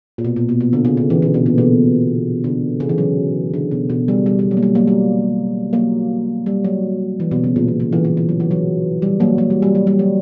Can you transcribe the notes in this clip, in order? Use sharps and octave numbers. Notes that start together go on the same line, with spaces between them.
A#2
B2
A#2
B2
B2
D3
C#3
D3
E3
D3
B2
A#2
B2
D3
C#3
E3
F#3
D3
B2
B2
G3
G3
G3
F#3
A#3
G3
F#3 A#3
G3
F#3 A#3
G3
F#3
E3
B2
C#3
A#2
B2
C#3
E3
E3
E3
F#3
E3
F#3
G3
F#3 A#3
F#3 A#3
G3
G3
F#3
G3
F#3